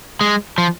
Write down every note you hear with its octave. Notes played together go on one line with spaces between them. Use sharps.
G#3
F3